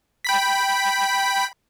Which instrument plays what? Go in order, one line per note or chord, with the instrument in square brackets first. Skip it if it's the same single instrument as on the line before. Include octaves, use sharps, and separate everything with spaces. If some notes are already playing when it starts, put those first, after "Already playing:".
[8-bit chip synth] G5 B5 B6